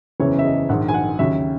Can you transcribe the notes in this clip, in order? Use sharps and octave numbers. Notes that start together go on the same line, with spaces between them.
F#1 E2 C#3 E3 C#5
E5
D#5
A#1 G#2 D#3 F#5
G#5
F#5
D#2 C#3 F#3 E5